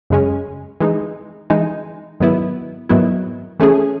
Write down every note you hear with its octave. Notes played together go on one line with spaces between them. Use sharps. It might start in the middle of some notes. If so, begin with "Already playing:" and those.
F#2 C#3 G#3 C#4
E3 G#3 D#4
E3 G#3 D#4
G#2 D#3 F#3 B3 E4
G#2 D#3 F#3 B3 E4
E3 A3 C#4 G#4